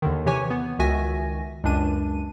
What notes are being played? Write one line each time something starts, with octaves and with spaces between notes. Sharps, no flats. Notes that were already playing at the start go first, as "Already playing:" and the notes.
D#2 D3 D#3
C3 E3 G4 C#5 G#5 C#6
B3
C#2 D#3 F#4 E5 G#5 A#6
C#2 F#2 D4 D#7